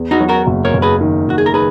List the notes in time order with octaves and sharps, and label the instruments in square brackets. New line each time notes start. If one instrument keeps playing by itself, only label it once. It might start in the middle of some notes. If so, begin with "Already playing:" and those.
Already playing: [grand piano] E2
[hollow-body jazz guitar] D#4 F#4
[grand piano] F#3
[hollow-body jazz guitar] F#4 A#4
[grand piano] F#1
[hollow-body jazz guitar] A#4 C#5
[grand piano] F#1
[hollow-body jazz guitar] G#4 B4
[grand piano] D#3
[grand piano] F#1 [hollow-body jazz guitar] F#4
[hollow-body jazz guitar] G#4
A#4
[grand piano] D#3 [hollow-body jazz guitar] G#4 B4